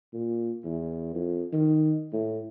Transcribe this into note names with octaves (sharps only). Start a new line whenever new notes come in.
A#2
E2
F2
D#3
A2